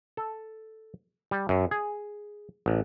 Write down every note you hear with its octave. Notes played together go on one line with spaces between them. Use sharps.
A4
G3
F#2
G#4
A1